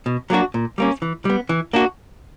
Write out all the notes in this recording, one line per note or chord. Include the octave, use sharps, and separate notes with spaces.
B2
F#3 A#3 D4 F#4
A#2
G3 A#3 C#4
E3
G3 B3
E3
A#3 D4 F#4